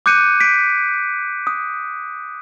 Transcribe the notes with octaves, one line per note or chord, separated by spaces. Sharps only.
D6 F#6 G6 C#7 D#7
B6 D7
D#6